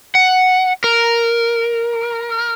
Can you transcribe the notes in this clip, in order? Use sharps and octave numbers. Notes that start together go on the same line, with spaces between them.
F#5
A#4